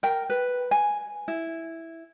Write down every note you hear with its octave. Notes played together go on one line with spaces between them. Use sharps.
A#4 G5
B4
G#5
E4